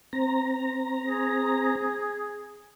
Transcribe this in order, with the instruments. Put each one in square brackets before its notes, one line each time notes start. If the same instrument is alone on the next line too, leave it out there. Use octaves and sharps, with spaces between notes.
[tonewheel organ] C4 A#5
[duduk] G#4